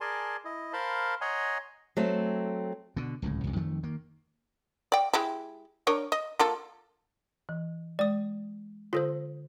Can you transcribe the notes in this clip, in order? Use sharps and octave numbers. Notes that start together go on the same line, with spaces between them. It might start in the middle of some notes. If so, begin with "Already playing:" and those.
G#4 A#4 D5 G#5 A5 C6
E4 D#5
A#4 C5 F5 A5 B5 C6
C#5 D#5 F#5 G#5 A#5 C6
F#3 A3 C4
B2 D3
D1 C#2 A2
C2 F2
F2 D#3 F3 A3
D#3 A#3
D5 G5
G#3 E4 G4
D4 A#4 C#5
D#5
A#3 F4 A4
E3
G#3 D5 D#6
D3 F4 A4 C5 D#6 A#6